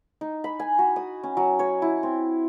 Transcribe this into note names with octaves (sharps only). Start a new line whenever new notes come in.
D#4
B5
G#5
F#4
D#6
C#4
F#3
C#5
E4
C4